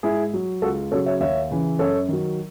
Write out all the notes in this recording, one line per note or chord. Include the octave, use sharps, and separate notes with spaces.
G#2 E4 G#4
F#3
C#2 F#4 A4
C#3 F#3 A4 C#5
C#5 E5
D#2 C#5 E5
C#3 E3
F#2 A4 C#5
D#3 F#3